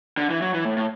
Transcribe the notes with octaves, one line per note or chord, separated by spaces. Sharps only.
D3
E3
F#3
E3
A2
A2